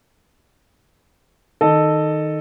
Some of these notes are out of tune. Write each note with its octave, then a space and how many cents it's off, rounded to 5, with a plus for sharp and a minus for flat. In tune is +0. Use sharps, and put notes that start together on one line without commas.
D#3 +0 A4 +0 D#5 -20